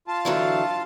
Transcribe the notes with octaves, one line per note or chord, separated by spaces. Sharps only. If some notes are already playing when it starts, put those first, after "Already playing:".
F4 A5
D3 E3 F#3